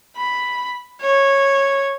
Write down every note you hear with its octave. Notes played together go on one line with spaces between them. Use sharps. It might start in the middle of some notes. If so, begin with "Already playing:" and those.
B5
C#5